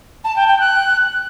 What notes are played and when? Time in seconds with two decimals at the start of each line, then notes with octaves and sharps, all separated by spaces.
0.24 A5
0.36 G5
0.48 G5
0.59 F#6